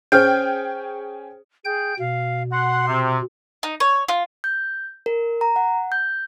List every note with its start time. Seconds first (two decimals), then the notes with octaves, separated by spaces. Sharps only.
0.12 C#4 G#4 C5 G5 F6 G6
1.65 G#4 G5 G6
1.99 B2 F5
2.52 F#5 C6
2.87 C3
3.63 D#4
3.80 C#5
4.08 F4
4.44 G6
5.06 A#4
5.41 A#5
5.56 F#5
5.92 G6